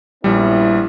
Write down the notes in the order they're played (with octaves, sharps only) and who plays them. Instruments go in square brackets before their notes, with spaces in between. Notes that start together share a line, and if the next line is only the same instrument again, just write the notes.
[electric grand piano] A#1 G3 [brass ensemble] B3 C#4 E4